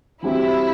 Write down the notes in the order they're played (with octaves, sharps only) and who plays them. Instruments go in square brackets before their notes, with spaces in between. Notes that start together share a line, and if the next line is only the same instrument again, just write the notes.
[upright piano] E3 G3 C4 F#4 C5 [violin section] E4